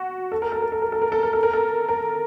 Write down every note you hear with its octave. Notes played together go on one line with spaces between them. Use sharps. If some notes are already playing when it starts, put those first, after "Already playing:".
Already playing: F#4
A4
A#4
A4
A#4
A4
A#4
A4
A#4
A4
A#4
A4
A#4
A4
A#4